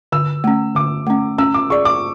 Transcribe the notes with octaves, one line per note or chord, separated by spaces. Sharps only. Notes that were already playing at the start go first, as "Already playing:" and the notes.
D3 E6
A3 C#4
D3 D6
A3 C#4
C#4 E6
D6
G#4 D5 C#6
D6